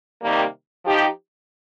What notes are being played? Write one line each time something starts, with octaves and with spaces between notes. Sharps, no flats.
C3 D#3 G3 A#3
F3 D#4 G4